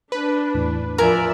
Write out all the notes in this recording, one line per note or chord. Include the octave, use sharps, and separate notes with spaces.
D4 B4
E2 A2 E3
F3 A#4 D5 E5 G#5